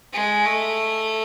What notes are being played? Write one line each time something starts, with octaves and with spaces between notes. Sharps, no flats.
G#3
A3